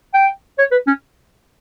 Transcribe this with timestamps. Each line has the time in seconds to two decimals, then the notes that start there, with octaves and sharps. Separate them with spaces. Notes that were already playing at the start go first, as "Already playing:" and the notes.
0.14 G5
0.58 C#5
0.71 B4
0.87 C#4